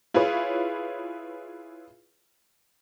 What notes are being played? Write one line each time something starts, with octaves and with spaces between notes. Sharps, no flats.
E4 F4 G#4 B4 C#5